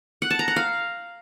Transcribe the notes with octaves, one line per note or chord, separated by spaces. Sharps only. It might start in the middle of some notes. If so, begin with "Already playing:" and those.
F#5
A5
A#5
F#5
F5